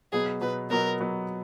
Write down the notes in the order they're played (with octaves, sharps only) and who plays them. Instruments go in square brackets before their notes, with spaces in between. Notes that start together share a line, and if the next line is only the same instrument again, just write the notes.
[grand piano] B2 F#3 B3 [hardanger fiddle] G#4
[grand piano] B2 F#3 B3 [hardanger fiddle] B4
[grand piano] B2 F#3 B3 [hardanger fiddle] A#4
[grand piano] B2 F#3 B3